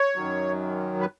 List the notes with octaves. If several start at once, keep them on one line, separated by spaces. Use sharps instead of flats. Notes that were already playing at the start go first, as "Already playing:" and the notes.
Already playing: C#5
F#2 D#3 F#3
B4